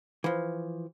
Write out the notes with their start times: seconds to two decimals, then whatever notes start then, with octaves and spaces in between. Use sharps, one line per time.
0.24 E3 F3